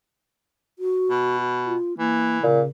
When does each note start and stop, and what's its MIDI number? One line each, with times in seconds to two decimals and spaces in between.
0.79 1.37 66
1.10 1.75 47
1.66 1.97 65
1.98 2.43 52
1.98 2.42 58
2.43 2.61 46
2.43 2.68 49